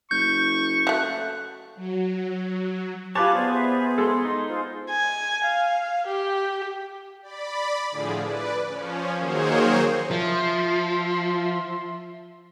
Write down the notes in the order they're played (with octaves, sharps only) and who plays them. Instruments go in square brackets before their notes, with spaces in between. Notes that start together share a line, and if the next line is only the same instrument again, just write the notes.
[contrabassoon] F#1 [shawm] C#6 [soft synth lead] G6
[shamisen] F#3 A3 [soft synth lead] F#6
[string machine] F#3
[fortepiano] F4 A5 [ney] G4 [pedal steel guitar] B4 C#5 [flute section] G#5 D6
[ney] B3 [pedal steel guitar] G#4 [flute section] C5 D5
[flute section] B4 C5 E5
[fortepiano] G#3 A4 [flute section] C6
[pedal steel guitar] D#4 [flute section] C6
[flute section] F4 G#4 C5
[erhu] G#5
F5
G4
[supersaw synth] D5 B5
A2 D3 F3 G#4
B4 D5
F3 C#4
D#3 F#3 A#3 G#4 C5 C#5
[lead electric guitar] F3 [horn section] E5 C6